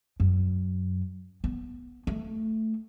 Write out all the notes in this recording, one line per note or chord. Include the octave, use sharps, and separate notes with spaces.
F#2
B3
A3